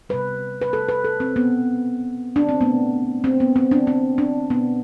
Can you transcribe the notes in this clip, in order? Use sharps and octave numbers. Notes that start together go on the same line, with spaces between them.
C3 G3 B4
B4
A4
B4
A4
C4
B3
D4
C4
D3 A3 B3
C4
B3
C4
D4
C4
D4
B3